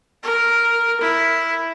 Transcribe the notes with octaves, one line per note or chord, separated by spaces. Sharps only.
A#4
E4